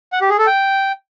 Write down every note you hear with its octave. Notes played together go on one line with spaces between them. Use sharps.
F#5
G4
G#4
A4
G5